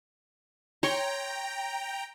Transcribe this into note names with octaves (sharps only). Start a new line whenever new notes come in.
C#5 G5 A#5 C6 C#6